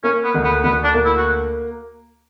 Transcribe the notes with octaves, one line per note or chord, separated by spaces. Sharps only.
A#3 C#4
B3
D2
B3
D2 B3
D4
A#3
E4
F#4